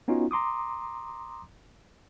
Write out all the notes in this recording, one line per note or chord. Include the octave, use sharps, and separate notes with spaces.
B3 C#4 D#4 F4 F#4
A#5 C6 D6 D#6